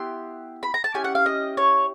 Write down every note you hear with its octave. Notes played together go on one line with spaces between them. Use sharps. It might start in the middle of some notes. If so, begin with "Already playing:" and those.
Already playing: B3 E4 G4 C6
B5
A#5
A5
C#4 E4 G4 G#5
F#5
F5
D#5
C#5